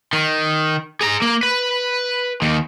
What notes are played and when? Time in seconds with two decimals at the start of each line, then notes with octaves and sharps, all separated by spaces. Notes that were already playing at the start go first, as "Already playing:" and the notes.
0.13 D#3
1.01 G#4 A#5
1.22 A#3
1.43 B4
2.42 D#2 D#3